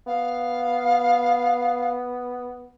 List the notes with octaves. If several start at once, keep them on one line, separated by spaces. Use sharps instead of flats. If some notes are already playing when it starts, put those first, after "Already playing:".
B3 F5